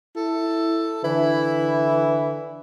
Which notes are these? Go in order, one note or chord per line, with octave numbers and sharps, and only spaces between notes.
E4 A4
D3 E3 E4